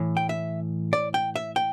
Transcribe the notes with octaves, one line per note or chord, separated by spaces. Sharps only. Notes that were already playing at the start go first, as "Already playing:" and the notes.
Already playing: A2 E3
G5
E5
D5
G5
E5
G5